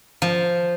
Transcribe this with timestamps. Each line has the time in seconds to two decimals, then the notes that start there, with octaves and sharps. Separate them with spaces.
0.22 F3